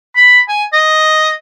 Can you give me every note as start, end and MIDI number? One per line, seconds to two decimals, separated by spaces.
0.16 0.39 83
0.48 0.64 80
0.73 1.32 75